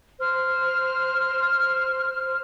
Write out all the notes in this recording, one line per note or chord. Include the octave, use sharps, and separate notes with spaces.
C5 F6